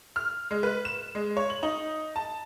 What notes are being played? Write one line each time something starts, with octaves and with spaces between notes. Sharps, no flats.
F6
G#3
B4
E7
G#3
C#5
F#7
D#4
A5